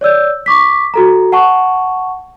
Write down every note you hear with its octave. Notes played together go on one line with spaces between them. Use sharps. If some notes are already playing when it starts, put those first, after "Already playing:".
C#5 D5 E6 G6
C#6 D6 B6
F#4 A4 A#5
F#5 A5 C#6